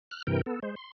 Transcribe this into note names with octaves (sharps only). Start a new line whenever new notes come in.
F6 F#6
G2 C3 E3 A#4 G5
B3 A4
G#3 C5
C6